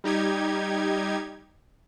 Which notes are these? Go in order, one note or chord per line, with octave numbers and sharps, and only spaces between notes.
G3 D#4 G4 G#6